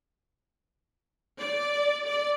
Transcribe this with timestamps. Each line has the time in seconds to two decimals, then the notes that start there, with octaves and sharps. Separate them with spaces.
1.40 D5
2.06 D5